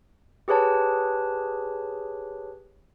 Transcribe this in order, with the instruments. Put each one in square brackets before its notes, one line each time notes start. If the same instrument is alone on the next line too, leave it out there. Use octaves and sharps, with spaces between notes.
[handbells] G4 G#4 B4 C#5 A5